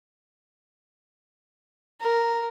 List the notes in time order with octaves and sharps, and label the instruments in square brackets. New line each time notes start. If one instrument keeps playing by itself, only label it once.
[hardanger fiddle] A#4